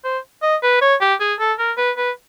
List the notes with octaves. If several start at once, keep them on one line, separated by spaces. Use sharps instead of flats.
C5
D#5
B4
C#5
G4
G#4
A4
A#4
B4
B4